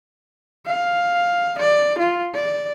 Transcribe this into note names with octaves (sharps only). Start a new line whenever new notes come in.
F5
D5
F4
D5